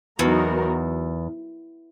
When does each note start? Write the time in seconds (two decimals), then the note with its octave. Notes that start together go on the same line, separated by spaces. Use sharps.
0.19 E2 F#3 B3 D#4 F#4 A#4